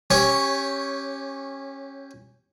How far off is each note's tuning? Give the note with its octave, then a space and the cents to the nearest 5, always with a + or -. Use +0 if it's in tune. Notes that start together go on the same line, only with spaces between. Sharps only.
C#4 -20 G4 +0 C#5 +0